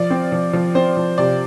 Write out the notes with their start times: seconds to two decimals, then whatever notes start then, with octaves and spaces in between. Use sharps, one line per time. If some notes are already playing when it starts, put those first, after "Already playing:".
Already playing: F3 D5
0.10 C4
0.32 F3
0.53 F3
0.75 C4 C5
0.97 F3
1.18 C3 D5